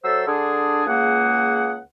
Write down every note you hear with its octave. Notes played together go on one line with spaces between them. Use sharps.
F#3 A4 C5 E5 E6
D3 D4 G#4
C#2 A#3 G#4 F#5